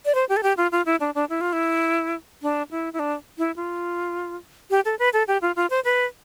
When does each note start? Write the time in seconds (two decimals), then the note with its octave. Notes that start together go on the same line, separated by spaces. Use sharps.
0.05 D5
0.15 C5
0.29 G4
0.37 A4
0.43 G4
0.57 F4
0.72 F4
0.86 E4
1.00 D4
1.15 D4
1.29 E4
1.41 F4
1.53 E4
2.43 D4
2.71 E4
2.93 E4
2.99 D4
3.38 E4
3.56 F4
4.70 G4
4.85 A4
4.99 B4
5.13 A4
5.28 G4
5.42 F4
5.56 F4
5.70 C5
5.85 B4